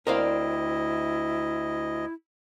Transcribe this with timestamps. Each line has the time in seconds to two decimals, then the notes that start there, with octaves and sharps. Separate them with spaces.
0.07 D2 C4 E4 A#4 C5 D5 D#5 F5